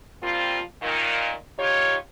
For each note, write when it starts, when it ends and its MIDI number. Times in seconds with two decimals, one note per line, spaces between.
0.22 0.59 53
0.22 0.59 55
0.22 0.59 58
0.22 0.59 60
0.22 0.59 65
0.82 1.33 46
0.82 1.33 51
1.58 1.95 63
1.58 1.95 65
1.58 1.95 67
1.58 1.95 73